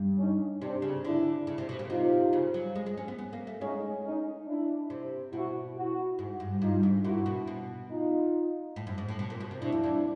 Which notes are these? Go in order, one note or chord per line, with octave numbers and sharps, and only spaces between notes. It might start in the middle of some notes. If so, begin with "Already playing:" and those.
Already playing: G2
C#4 D#4
C3 C4 D4
C#3
D3 D4 E4
C#3
C3
B2
A#2
C3 D#4 F4
C#3
F#3
G#3
G#3
C#4
B3
B3
A#3
A3
G#3 C#4 D#4
C#4 D#4
D4 E4
C3
B2 E4 F#4
E4 F#4
G#2
G2
G2 D#4 F4
G#2
A#2 E4 F#4
B2
B2
D#4 F4
A2
F#2
G#2
A2
B2
A#2
B2
C3
B2 D4 E4
F2
F2